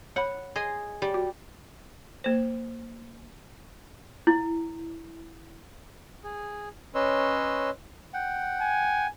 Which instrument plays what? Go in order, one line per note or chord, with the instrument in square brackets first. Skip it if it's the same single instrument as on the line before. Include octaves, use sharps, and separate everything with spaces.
[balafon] C#5 B5 [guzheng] F#5
[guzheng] G#4 D#5 C6
[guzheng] G3 [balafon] G4
[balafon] F#4
A#3 C5
[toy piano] E4
[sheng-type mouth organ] G#4
C#4 B4 C#5 D#5 C6 E6
[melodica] F#5 G5
[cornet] G#5